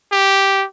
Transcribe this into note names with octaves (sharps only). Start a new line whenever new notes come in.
G4